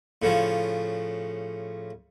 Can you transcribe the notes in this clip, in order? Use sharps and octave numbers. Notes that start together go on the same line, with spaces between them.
A2 C#3 F3